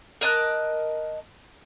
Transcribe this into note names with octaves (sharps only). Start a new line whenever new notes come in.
A#4 D#5 A5 F#6